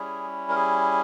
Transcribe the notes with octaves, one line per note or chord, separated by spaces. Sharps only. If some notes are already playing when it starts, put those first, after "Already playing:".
Already playing: G3 C#4 E4 G#4
A#4
G#4